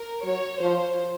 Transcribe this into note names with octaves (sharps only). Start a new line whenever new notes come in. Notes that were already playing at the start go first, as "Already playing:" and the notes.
Already playing: A#4
F#3 C#5
F3 C5